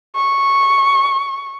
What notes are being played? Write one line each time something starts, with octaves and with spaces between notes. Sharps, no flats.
C#6